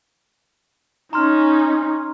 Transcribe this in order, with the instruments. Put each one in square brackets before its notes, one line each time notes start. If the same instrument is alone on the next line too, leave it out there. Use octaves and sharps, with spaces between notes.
[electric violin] C#4 D#4 [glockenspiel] A#5 C6 F6